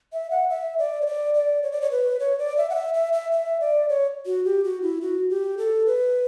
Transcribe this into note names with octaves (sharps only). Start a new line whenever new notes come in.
E5
F#5
E5
D5
C#5
D5
D5
C#5
D5
C#5
B4
C#5
D5
E5
F#5
E5
E5
E5
E5
D5
C#5
F#4
G4
F#4
E4
F#4
G4
A4
B4